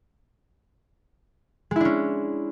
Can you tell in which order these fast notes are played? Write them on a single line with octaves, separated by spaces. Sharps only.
G#3 E4 D4 C#4